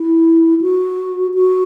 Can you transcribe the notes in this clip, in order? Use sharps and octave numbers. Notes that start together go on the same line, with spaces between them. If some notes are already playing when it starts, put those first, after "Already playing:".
Already playing: E4
F#4
F#4